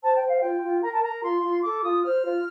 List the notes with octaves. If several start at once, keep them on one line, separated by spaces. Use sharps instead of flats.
C5 A5
G5
C5
F5
F4 G5
F4
A#4 A#5
A5
A#4 A#5
F4 C6
F4
A4 D6
F4 D#6
C5 F6
F4